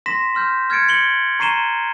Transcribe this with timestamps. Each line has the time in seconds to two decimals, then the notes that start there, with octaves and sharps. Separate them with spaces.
0.06 C6 A#6 B6 E7
0.35 C6 F6 G6
0.70 F6 G#6 A6 C#7 D7
0.88 C#7 F#7 G7
1.39 A#5 C#6 C7 D#7 E7 G7